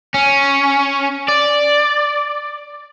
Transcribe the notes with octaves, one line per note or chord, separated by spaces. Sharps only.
C#4
D5